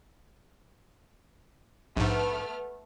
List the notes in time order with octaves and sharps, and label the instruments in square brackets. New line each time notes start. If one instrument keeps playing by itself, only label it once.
[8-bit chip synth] A#1 G#2 [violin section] A3 B3 F6